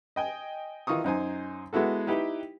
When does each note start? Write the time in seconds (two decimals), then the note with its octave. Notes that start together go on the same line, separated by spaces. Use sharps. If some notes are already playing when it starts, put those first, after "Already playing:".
0.16 D#5 G5 G#5
0.87 D#3 E3 D#4 F4 C#6 D#6
1.04 F#2 D#4 C5 G#5
1.73 G#3 B3 E4 F#4 A4
2.07 D#4 E4 G4 B4 G5